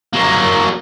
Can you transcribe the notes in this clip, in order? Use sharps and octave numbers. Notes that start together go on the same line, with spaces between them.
F#3 A#3